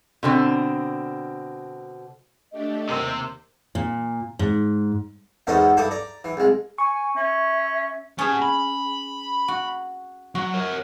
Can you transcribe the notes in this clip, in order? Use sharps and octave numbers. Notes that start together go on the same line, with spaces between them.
B2 D3 C4
A3 D4 G4 D#5
D#2 C3 A#4 C5 C6 E6
A#2
G#2
E2 G#2 B3 C#4 A4 D#5
G2 E4 A4 E5 D6 D#6
D5 A#5
E3
C2 G#3
G#5 C#6
C#4 E5
B3 C#4 G#4 A5
B5
F#4
F#3 F#4
A#4 C#5